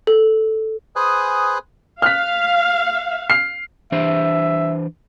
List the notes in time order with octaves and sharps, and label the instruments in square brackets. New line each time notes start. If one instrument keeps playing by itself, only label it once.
[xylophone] A4
[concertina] G#4 B4 C5 G#5 D#6 F#6
[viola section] F5 [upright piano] F6 F#6 B6
[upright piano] F6 C7
[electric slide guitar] E3 D4 C5 [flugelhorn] E5